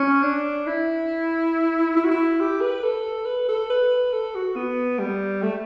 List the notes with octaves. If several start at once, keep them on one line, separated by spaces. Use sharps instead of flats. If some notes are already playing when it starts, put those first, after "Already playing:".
Already playing: C#4
D4
E4
E4
F#4
E4
G4
B4
A4
B4
A4
B4
A4
F#4
B3
G3
A3